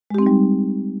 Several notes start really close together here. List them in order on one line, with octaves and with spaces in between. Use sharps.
G#3 G4 C4 D#4 G3